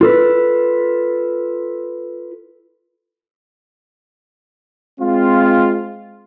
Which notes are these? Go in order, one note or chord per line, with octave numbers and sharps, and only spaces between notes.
F4 A4 B4
G#3 C4 F4